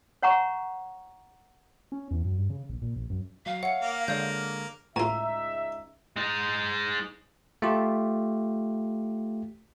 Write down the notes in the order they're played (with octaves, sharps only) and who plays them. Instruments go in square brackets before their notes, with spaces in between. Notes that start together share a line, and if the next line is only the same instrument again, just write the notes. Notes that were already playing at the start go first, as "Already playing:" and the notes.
[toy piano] C#5 F#5 A#5 C#6
[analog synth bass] C#4
E2
F#2
G2
C#3
A#1
A#2
A#1
F#2
[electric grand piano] F#3 [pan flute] F5
[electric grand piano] C#5 E5 [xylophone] F#5 C#7
[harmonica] A#3
[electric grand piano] D3 G#3 C#5 [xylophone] D5 G6
[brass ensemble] C#2 D#4 E5 [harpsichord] A2 F4 [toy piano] A#5
[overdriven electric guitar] G#3 D#4
[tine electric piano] A3 F4 G4